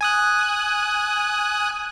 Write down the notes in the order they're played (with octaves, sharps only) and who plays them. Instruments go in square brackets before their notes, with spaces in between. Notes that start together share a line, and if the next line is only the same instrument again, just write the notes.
[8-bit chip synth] G#5 D#6 F#6